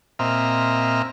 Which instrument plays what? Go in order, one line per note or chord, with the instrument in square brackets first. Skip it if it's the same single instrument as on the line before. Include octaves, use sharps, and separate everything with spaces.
[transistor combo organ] A#2 C4 D#5 E5 A#5 F6